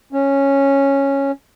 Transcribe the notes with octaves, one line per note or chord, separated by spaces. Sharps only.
C#4